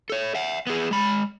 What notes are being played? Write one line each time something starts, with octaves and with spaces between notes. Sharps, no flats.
A4 C#5
E5 F#5
B3 G#4
G#3 B5